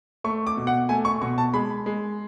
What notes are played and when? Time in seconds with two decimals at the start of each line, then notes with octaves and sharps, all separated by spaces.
0.24 A3 C#6
0.47 D6
0.57 B2
0.67 F#5
0.89 A3 G#5
1.05 C#6
1.22 B2 C#6
1.38 A5
1.53 G#3 B5
1.86 G#3